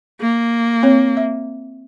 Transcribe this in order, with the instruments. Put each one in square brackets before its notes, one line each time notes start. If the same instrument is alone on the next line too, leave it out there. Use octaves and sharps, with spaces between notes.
[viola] A#3
[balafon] C4 C#5
E5